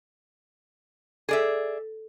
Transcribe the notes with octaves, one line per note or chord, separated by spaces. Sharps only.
G#4 A4 D5 E5